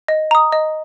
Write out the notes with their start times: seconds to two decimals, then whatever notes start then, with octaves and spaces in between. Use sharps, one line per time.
0.08 D#5
0.31 A#5 D#6
0.52 D#5